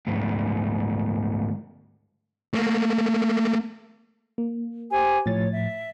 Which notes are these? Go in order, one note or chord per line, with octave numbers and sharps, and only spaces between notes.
D2 G#2
A3 A#3
A#3
G4 C5 G#5
A2 F3 C#5 A6
E5